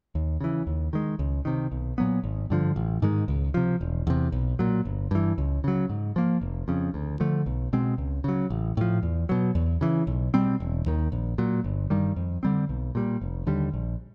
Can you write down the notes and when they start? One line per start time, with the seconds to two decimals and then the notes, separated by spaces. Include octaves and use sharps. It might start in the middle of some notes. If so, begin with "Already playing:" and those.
0.15 D#2
0.41 C#3 E3
0.67 D#2
0.93 D#3 G#3
1.19 C#2
1.45 C3 D#3
1.71 B1
1.98 A#2 F#3 B3
2.24 G#1
2.50 G2 D3 F3
2.76 A1
3.02 G#2 D#3 G#3
3.28 C#2
3.54 C3 F3
3.81 E1
4.07 E2 C3
4.32 B1
4.59 A#2 F#3
4.85 G1
5.11 G2 E3
5.38 C#2
5.64 C#3 F#3
5.90 G#2
6.16 F3 A#3
6.41 F1
6.68 F2 C#3
6.94 D2
7.20 D3 F3 A3
7.46 B1
7.73 B2 G#3 C4
7.98 C#2
8.24 C#3 F#3
8.50 A1
8.77 A2 F3
9.03 E2
9.29 B2 F#3
9.55 E2
9.81 C#3 E3
10.07 B1
10.34 B2 G3 C4
10.60 E1
10.86 D#2 D#3
11.12 A#1
11.38 A#2 F#3
11.64 G1
11.90 G2 D#3 G3
12.16 F2
12.43 D3 G3 C4
12.69 B1
12.95 A#2 G3
13.22 F1
13.47 D#2 D3 G3
13.74 A#1